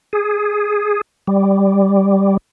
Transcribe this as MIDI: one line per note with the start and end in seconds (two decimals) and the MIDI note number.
0.13 1.01 68
1.27 2.37 55